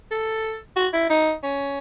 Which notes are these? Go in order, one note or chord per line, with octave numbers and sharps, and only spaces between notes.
A4
F#4
E4
D#4
C#4